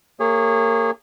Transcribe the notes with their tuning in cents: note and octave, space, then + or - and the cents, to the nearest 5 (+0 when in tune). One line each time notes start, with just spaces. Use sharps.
A#3 -25 G#4 -25 C#5 -5